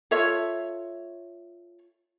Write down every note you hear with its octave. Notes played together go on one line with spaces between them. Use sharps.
F4 A4 C#5 E5